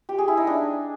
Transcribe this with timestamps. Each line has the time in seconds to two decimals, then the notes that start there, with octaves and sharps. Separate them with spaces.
0.09 G4
0.18 G#4
0.28 E4
0.37 D#4
0.47 D4